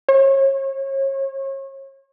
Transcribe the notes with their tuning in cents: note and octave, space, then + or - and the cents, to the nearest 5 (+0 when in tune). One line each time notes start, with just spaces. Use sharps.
C#5 -35